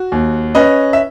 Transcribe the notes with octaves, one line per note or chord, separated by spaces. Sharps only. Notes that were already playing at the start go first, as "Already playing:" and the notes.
Already playing: F#4
D#2
C#4 B4 D#5
E5